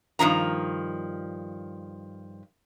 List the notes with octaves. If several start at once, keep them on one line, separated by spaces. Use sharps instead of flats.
G2 D#3 F3 A#5